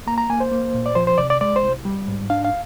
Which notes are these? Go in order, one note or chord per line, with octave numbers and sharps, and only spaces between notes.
A#3 A#5
A#5
A#3 G#5
C5
A#3
A#2
D5
F3 C5
C5
C3 D5
D5
G#3 D5
C5
C2
G3
G#2
D4 F5
F5